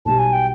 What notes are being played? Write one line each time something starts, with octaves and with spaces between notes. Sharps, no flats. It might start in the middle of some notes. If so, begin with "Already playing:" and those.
B1 B2 G3 A5
G#5
G5